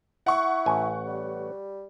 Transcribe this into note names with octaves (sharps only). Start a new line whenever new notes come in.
E4 F#5 C#6
A1 G#5
G3